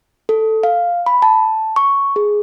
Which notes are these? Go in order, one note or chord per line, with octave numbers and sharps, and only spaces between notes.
A4
F5
B5
A5
C#6
G#4